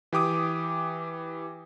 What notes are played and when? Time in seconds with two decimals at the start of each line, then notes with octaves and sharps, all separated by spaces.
0.13 E3 G4 D6 D#6